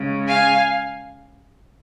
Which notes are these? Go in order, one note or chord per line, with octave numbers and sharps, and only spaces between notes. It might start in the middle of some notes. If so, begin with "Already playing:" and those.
Already playing: C#3 G#3
F5 G#5